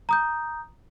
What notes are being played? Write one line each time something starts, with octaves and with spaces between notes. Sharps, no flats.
A#5 D#6 G6